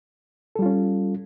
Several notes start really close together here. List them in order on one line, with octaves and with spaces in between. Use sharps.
A4 G3 F4 C#4